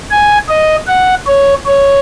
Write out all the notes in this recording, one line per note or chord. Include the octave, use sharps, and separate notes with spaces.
G#5
D#5
F#5
C#5
C#5